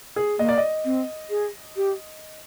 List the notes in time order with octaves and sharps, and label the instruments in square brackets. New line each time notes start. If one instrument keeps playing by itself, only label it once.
[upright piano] G#4
[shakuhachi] A#3 [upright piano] D#5
[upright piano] D5
D#5
[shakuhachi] C4
G#4
G4